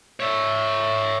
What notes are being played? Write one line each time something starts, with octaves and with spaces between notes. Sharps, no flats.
C#5 E5